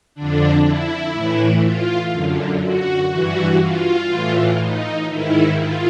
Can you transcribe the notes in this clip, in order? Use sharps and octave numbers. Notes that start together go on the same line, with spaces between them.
F2 D3 D4
E4
A2 E3
F4
F#2 D3
F#4
G2 E3 F#4
F4
A2 E3
D#4
G#2 D#3 E4
F4